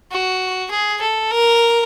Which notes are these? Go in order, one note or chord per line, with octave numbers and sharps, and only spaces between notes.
F#4
G#4
A4
A#4